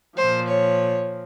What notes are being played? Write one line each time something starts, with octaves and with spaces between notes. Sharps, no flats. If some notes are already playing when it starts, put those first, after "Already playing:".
A#2 F3 C5
C#5